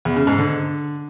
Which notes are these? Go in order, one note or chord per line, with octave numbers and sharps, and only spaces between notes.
E2
C#3
G#2
D3